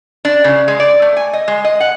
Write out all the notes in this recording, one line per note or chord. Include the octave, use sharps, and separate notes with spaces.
D4
C#3
G#3
D5
A3
G#5
D#5
G#3
D#5
F#5